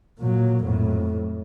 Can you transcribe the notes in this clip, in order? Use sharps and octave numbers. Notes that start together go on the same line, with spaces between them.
A#2 F#3
F2 A2